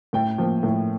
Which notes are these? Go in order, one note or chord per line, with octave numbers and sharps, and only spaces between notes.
A2 G5
F3 A#3
A2